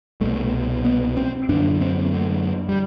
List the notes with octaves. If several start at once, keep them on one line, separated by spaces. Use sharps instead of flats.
C2 B2 A3
B3
C4
F#2 D3 D4
C4
A3
G3